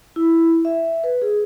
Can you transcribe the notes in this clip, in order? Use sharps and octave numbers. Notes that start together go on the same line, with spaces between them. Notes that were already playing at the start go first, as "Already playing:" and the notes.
E4
E5
B4
G#4